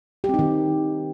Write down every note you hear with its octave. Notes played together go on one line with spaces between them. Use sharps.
G4
C4
D#4
D#3